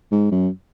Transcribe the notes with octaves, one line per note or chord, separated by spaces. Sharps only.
G#2
F#2